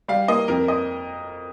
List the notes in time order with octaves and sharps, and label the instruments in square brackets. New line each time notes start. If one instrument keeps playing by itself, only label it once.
[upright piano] G3 F5
A#3 D#5
F2 A#4
D#5